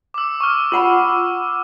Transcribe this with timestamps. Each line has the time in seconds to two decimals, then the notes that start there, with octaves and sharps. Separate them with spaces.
0.14 D6 E6
0.40 C#6 F6
0.72 F4 F#5 B5 E6